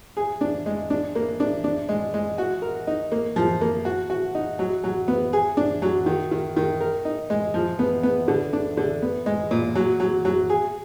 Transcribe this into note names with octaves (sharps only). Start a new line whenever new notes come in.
G#4
D4
G#3
D4
A#3
D4
D4
G#3
G#3
F#4
A#4
D#4
A#3
F3
A#3
F#4
F#4
D#4
F#3
F#3
B3
G#4
D4
F#3
D#3
D#3
D#3
A#4
D#4
G#3
F3
B3
B3
D3
D4
D3
B3
G#3
A#2
F#3
F#3
F#3
G#4